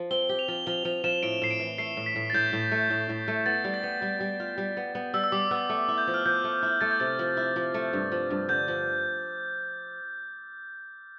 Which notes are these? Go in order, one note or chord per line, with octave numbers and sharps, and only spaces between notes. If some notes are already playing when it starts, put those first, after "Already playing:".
Already playing: F3
C4 G7
G4
F7
F3
F3 G7
F3 F7
F3 E7
A2 D7
A2 C7
D7
E3
A3 C7
A2
B6
A2
A6
A2 G6
A2
A3
A2
A2
A3
B3 A6
G3
A6
B3
G3
G3
F4
G3
B3
B3
G3 E6
E6
G3 D6
B3 E6
A3
E4
G6
F3
F6
F3 G6
A3
E4
A3 A6
G6
C3 A6
F3
E4
F3
A3
G2
F3
G2
D3 G6
F3